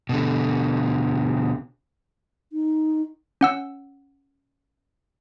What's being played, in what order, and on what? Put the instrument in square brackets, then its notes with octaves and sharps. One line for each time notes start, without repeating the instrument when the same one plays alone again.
[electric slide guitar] B2 D3
[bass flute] D#4
[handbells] C#4 F#5 E6